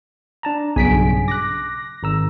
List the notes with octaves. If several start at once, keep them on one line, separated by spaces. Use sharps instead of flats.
D4 A5 A#5
B1 G2 C#3 G#5 B6 D7
D6 F#6 A#6
G#1 A#5 E6